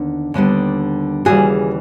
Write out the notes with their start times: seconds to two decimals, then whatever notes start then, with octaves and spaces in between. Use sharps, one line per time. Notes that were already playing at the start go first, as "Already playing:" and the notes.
Already playing: D#2 D3 B3
0.34 D#2 D3 G3 B3
1.25 D#2 C#3 E3 G3 F#4 G#4